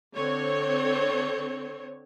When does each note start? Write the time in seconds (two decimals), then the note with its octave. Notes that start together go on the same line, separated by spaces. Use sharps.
0.15 D3 C4 C#5